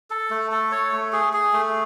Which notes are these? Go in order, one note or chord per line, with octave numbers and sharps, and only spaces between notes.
A4
A3
A4
C#5
A3
G#4
G#4
A3